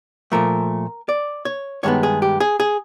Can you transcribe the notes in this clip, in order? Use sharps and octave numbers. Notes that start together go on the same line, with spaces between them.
A#2 F3 A3 A#4
D5
C#5
G2 D#3 G#3 B3 C#5
G#4
G4
G#4
G#4